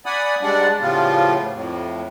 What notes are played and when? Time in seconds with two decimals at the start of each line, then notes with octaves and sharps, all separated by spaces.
0.06 D5 F#5 G#5 B5 D#6
0.42 G#2 G3 G#3 D4 D5 F#5
0.81 A2 C#3 F3 G3 B3 F4
1.53 F2 A2